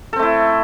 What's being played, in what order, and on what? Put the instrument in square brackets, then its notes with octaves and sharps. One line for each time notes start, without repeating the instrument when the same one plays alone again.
[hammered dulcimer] A4
C4
A3
E4